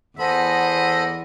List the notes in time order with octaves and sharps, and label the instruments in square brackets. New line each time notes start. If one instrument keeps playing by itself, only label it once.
[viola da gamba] E2 [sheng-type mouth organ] B3 A4 B5 [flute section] C5 G#5 C6 [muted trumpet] D#5